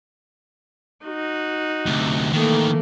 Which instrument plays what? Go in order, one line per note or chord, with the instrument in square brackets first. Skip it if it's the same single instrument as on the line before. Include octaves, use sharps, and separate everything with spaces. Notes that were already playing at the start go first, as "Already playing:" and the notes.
[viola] D#4 F#4
[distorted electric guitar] D2 C3
[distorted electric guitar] D#3 E3 [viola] A3 A#3